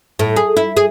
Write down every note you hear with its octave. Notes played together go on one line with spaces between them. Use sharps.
A2
G#4
E4
G#4